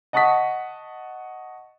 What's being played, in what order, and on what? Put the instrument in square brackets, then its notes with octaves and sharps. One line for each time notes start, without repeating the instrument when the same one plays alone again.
[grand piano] D#5 F#5 A5 C#6 D#6 B6